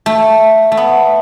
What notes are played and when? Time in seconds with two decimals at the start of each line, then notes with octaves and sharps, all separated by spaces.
0.06 A3
0.72 A3
0.77 B3